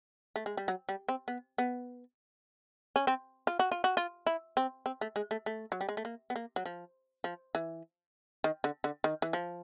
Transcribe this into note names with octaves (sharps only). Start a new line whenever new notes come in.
A3
G#3
G3
F#3
G3
C4
B3
B3
C#4
C4
F4
F#4
F4
F#4
F4
E4
C4
C4
A3
G#3
A3
A3
F#3
G3
G#3
A3
A#3
B3
A#3
F#3
F3
F3
E3
D#3
D3
D3
D#3
E3
F3